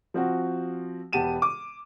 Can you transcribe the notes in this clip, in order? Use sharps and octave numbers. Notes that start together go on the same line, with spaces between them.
F3 C4 F#4
E1 B3 G4 A5 D#7 E7
D6